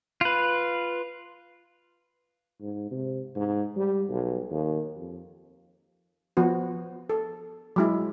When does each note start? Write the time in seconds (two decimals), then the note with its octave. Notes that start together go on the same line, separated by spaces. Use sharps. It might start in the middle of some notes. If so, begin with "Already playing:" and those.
0.21 F4 B4
2.61 G#2
2.91 C3
3.36 G#2
3.76 G3
4.09 B1
4.51 D#2
4.97 F2
6.37 F3 B3 F#4
7.10 A4
7.76 F#3 G#3 E4